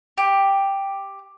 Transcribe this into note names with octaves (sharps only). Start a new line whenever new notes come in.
G4